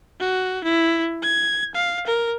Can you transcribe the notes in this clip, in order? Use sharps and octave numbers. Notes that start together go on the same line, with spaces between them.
F#4
E4
G#6
F5
A#4